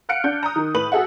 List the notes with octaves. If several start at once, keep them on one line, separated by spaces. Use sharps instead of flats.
F5 F#5 F6 F#6 C#7 D7
D4 G6
A#5 D#6
D#3
A2 B4 F#7
F#4 G#4 A4 E5 F#5